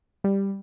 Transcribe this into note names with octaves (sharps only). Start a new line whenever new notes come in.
G3